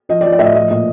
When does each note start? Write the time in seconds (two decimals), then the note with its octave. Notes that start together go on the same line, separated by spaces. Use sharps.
0.09 F3 D#5
0.21 D5
0.25 F3
0.32 D5
0.39 A2 E5
0.44 D#5
0.55 F3 D#5
0.70 A#2 D#5